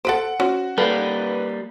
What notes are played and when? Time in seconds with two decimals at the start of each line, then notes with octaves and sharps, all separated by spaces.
0.05 A4 B4 C5 F#5 D7
0.40 C#4 F#4 C5
0.78 G3 A#3 A4 B4